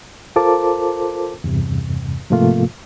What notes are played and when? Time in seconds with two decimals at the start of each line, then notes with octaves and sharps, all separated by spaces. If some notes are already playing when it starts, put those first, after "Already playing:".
0.36 F4 A4 A#4 C5 A5 D6
1.44 E2 G2 C3
2.30 G#2 C3 F3 A3 A#3 F4